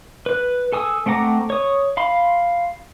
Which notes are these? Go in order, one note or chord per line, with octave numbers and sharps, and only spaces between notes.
B4 F#6
A4 G#5 D#6 E6
A3 C4 F#5 A#5 D6
C#5 D#6
F5 B5 C6